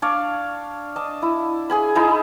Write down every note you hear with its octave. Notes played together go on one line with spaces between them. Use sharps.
D4 C#5 D5 F5
D4 D#5 A5
E4
G#4 G#5 B5
D#4 E4 G#4 A#5